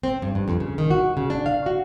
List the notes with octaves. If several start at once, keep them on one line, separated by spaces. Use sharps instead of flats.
C4
G2
G2
F2
C#3
D#3
F#4
C#3
D4
F5
F#4